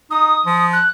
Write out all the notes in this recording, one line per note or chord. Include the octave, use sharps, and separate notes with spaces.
D#4 D#6
F3
F#6